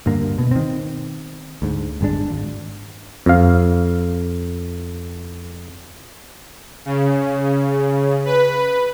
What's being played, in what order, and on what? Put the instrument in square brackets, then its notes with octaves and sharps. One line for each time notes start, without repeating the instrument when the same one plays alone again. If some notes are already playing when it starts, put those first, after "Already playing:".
[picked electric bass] D2 G2 D3 A#3
B2
D#3 C4
D2 G#2
G1 G#2 G#3 D4
G#1
[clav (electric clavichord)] F2 F5
[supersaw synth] C#3
B4